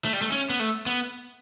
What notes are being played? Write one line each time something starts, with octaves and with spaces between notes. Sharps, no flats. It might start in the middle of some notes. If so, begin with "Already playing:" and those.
A3
G3
A3
C#4
B3
A3
B3